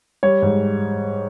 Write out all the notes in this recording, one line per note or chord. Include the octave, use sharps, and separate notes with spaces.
G3 C#5
G#2